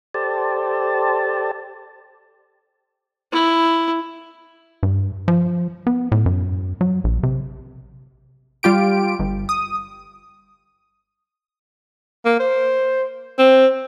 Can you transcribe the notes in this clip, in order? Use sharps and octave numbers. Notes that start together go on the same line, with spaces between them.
G4 A4 C5 D5 A5
E4
G2
F3
B3
A2
F#2
F#3
A#1
C3
G3 F4 G4 D7
G1
D#6
A#3
C5
C4